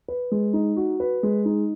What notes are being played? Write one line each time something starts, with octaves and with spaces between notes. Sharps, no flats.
B4
G#3
D#4
F#4
B4
G#3
D#4